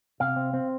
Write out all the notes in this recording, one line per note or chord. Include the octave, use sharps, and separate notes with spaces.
C3 F5
C4
C4